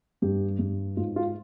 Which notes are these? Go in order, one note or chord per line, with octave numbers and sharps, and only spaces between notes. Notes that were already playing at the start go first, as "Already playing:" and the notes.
G2 G4
G2
G#2 F4
F4